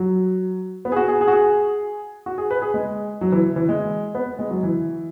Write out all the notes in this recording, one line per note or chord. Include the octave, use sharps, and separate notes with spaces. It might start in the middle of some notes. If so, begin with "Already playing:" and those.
Already playing: F#3
B3
G#4
F#4
G#4
G#4
F#4
G#4
F#4
G#4
B4
G#4
G#3
F#3
E3
E3
G#3
B3
G#3
F#3
E3